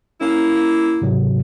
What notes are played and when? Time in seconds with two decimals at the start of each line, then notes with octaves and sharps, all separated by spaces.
0.21 A#3 C#4 E4
1.02 G#2 C3 F#3